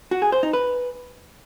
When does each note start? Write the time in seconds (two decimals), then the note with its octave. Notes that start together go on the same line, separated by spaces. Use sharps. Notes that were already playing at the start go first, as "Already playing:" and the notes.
0.11 F#4
0.22 G#4
0.32 C5
0.43 D#4
0.53 B4